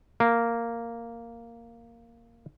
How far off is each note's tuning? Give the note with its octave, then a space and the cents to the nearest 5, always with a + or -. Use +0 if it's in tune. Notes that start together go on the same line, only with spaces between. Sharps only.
A#3 -5